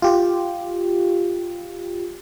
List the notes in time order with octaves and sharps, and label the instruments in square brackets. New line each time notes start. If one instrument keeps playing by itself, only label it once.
[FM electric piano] F4 G4